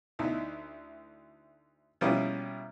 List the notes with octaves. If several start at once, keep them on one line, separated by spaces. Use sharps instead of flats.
D2 D#4 E4
B2 F3 G3 A#3 C#4 E4